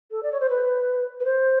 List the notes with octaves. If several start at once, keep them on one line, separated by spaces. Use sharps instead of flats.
A4
D5
C#5
C5
B4
B4
C5